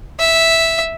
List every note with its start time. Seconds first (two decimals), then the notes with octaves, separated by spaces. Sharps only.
0.19 E5